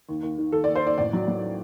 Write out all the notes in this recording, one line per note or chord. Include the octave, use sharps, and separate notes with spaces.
D#2
D#2
D#3
D#2 A4
D#2 D5
C5
D#2 D5
A1 D5
F#3
F#3